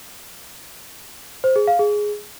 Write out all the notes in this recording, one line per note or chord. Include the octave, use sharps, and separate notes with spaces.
C5
G#4
F5
G#4